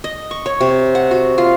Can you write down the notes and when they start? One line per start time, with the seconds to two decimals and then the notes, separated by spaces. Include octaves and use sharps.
0.04 D#5
0.31 C#6
0.46 C#5
0.61 C3
0.95 F#5
1.11 F#4
1.38 F4